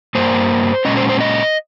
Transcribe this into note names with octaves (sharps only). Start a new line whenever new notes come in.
G2 G3 A#3 C5
A#2 G#3 C#4 D#5
C5
C5
D#5